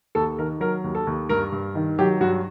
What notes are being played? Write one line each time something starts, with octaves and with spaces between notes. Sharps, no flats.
D#2 A4
D#3 A#4
F#3 A#4
D#2
A4
D#2
G2 A#4
G2
D#3
F#3 G4
G2 F#4